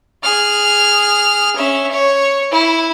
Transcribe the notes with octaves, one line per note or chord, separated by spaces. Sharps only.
G#4 F6
C#4 E5
C#5
E4